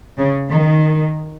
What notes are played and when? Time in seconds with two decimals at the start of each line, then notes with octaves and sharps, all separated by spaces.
0.18 C#3
0.50 D#3